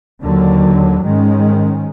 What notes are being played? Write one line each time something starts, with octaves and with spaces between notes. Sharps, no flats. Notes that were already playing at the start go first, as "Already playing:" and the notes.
D#2 D3 F#3
G#2 D#3 G#3 C#4